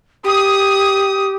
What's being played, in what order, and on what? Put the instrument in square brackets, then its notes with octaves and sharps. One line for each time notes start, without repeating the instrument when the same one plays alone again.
[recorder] G4 [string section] D#6